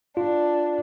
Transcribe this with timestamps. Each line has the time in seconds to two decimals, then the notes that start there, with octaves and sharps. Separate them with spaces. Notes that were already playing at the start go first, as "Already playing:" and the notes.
0.17 D4 F4